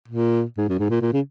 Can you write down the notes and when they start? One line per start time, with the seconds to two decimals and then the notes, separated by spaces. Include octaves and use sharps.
0.08 A#2
0.57 G#2
0.69 F#2
0.79 G#2
0.90 A#2
1.01 A#2
1.13 C#3